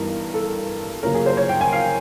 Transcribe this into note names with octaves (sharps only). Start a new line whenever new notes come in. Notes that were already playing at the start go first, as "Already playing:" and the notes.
Already playing: G2 E3 G3 B3 D#4 A#4
A4
F#2 C#3 F3 A#3 C#4 A#4
G#4
C5
C#5
G5
G#5
F5